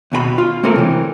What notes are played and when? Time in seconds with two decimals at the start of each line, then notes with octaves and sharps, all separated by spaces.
0.12 D#2 B2 G4 B5
0.38 F4
0.63 A3 A#3 C4 C#4 A4 A#4
0.76 C3 E3